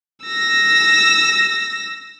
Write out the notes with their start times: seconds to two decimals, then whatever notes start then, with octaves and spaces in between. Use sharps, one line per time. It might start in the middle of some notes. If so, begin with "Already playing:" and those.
0.25 E6 A#6